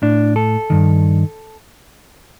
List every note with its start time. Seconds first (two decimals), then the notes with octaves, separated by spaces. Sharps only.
0.02 A2 D4
0.36 A4
0.70 G2 D#3